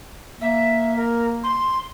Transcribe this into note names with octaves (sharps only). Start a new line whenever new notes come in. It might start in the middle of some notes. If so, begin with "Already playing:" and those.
A#3 E5
A#4
C6